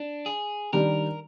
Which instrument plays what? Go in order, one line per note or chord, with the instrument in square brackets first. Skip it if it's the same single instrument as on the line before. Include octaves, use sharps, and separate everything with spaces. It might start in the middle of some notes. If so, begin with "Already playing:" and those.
Already playing: [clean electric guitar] D4
G#4
[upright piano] D#3 G3 D4 G4 [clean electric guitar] A#4